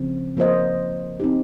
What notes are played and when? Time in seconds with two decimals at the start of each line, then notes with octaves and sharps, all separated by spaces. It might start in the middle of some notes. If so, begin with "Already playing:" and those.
Already playing: C#3 F3 C4
0.37 F3 A#3 F4 C5 D#5
1.20 C4 D#4 G4